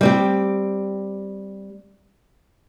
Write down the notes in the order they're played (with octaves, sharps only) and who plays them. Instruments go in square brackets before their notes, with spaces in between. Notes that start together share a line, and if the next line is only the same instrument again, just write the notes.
[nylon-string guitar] G3 C4 G4